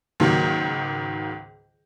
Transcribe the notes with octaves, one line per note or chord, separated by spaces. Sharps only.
C#2 G#2 D#3 F#3 A#3